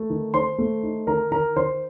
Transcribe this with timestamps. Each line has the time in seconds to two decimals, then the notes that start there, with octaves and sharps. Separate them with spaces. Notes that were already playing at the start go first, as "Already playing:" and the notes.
Already playing: A3
0.10 D#3
0.34 D#3 C5 C6
0.58 A3
0.83 D#4
1.07 D#3 A#4 A#5
1.31 D#3 A#4 A#5
1.56 D#3 C5 C6